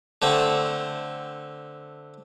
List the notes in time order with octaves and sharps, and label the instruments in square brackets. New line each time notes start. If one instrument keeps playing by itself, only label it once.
[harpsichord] D3 A3 C4